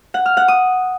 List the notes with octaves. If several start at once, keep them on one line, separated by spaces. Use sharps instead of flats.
F#5
F6
F#5
D#6